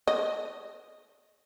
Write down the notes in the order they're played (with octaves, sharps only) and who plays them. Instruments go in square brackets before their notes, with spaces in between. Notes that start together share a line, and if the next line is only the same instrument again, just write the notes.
[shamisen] D#5